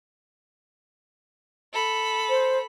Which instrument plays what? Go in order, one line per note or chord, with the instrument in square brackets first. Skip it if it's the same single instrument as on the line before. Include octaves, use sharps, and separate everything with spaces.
[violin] A4 B5
[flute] C5